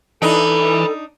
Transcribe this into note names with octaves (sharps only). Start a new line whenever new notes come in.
E3 D4 D#4 A4 G5 B5